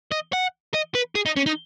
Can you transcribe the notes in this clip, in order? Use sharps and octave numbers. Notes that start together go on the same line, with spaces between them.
D#5
F#5
D#5
B4
G#4
D#4
C#4
D#4